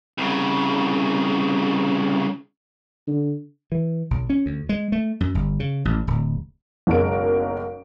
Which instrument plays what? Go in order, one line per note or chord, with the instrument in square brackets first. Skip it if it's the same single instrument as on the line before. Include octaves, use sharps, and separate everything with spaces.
[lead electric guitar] C2 C#3
[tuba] D3
[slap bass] E3
B1
C#4
D2
G#3
A3
F#2
G1
C#3
A1
D1
[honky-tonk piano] F#1 B1 F#2 G#3 A#4 D7